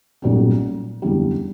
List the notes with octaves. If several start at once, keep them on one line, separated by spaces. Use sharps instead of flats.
B1 A#2 G3 C#4
F#1 E2 D3 G3